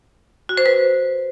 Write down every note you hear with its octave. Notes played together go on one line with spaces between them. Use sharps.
F#4
C5
B4